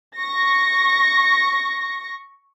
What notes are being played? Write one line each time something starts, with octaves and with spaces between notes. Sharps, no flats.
C#6 A#6